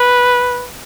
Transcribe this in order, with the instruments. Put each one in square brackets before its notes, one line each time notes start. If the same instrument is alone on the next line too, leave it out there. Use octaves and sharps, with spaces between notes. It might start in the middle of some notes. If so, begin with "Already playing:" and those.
Already playing: [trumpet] B4